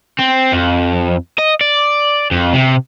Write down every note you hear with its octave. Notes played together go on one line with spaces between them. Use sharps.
C4
F2
D#5
D5
F2
C3